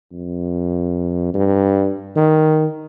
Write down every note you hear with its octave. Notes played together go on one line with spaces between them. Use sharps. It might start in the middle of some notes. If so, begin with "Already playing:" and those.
F2
G2
D#3